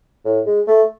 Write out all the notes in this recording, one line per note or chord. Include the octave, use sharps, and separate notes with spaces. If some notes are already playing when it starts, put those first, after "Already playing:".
A2
G#3
A3